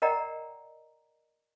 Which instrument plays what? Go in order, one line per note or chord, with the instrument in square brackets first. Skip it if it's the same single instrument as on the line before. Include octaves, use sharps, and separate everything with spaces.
[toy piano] A#4 D5 D#5 F#5 G5 A#5